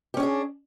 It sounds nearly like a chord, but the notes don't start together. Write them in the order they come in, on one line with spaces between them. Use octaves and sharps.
G4 C#4 D4 G#4